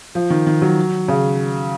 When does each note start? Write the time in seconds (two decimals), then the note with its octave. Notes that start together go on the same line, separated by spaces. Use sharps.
0.15 F3
0.30 D#3
0.47 D#3
0.62 F#3
1.08 C#3